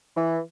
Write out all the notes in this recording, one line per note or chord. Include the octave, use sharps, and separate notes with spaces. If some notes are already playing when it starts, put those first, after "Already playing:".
E3